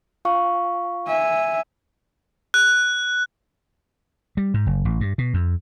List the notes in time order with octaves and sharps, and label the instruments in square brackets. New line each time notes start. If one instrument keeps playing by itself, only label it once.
[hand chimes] F4 F5 C#6
[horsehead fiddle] E5 G#5
[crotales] F#6
[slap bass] G3
G#2
F#1
A1
G2
B2
F2